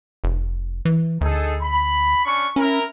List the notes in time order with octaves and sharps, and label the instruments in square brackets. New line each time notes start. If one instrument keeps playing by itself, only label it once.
[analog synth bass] F1
E3
[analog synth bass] D2 [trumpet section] D#4 G#4 A4
[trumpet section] B5
C#4 D4 C#6
[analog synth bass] C#4 [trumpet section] E4 A#4